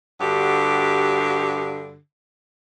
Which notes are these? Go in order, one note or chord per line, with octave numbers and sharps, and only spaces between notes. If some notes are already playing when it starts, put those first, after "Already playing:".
G2 D3 F#4 G4